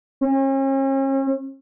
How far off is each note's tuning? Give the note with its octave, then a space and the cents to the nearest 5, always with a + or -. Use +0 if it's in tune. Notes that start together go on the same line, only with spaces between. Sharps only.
C#4 -40